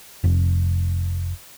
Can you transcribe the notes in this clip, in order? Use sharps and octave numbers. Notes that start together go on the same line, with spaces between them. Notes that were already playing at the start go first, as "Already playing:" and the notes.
F1